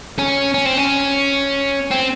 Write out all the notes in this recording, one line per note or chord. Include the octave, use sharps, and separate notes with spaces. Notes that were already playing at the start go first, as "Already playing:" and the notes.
C#4
C#4
C4
C#4
C4